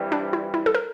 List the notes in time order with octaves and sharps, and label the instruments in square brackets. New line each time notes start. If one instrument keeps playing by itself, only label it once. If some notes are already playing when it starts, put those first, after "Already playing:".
Already playing: [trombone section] G2 E3 G3 C4
[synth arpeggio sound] D4
E4
E4
A4
A#4